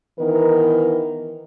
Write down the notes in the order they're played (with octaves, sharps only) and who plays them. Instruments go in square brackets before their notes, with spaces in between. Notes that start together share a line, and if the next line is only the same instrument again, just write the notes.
[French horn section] D#3 E3 B3 A#4